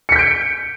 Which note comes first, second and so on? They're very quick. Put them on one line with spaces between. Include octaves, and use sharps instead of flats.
C#7 B6 G6 D7